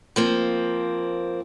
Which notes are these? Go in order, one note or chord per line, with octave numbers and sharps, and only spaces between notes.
F3 A#3 C4